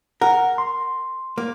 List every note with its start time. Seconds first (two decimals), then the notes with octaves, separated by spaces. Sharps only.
0.21 A#4 F#5
0.58 C6
1.38 A#3